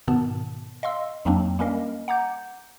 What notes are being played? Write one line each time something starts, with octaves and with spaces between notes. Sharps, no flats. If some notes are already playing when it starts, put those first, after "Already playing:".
G#2 B2 D#3 B3 A5
D#5 F5 C6 E6
F2 F#3 A#3 C4 D4
G3 A#3 C#4 A#4 D#5 F5
F#5 A#5 D6 G6